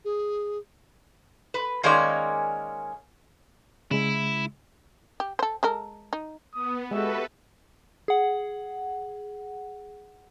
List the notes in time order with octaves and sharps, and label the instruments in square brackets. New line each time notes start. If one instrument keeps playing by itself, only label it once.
[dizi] G#4
[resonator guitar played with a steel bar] B4
D#3 G#3 A#3 C#4 G#4 D5
[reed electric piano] C#3 G#3 [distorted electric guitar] E4
[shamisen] G4
A4 C5
G#3 A4 A#4
D#4
[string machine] B3 [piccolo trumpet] D#6
[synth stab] G#3 [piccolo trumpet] F#4 [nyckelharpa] G4 E5 [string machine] A4 B4
[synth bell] G#4 F#5